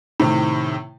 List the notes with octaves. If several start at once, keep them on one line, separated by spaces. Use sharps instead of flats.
A2 C3 D#3